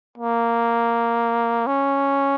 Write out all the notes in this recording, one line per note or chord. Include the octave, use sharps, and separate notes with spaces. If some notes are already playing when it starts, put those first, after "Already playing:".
A#3
C#4